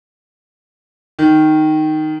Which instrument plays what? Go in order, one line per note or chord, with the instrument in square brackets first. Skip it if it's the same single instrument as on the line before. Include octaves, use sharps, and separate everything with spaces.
[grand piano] D#3